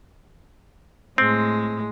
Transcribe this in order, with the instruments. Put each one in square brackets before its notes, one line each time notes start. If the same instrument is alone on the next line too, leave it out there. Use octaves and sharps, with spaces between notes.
[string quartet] A2 G#3 [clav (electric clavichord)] C4